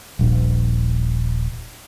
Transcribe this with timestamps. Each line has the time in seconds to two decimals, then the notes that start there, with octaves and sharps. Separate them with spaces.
0.19 D#1 A#1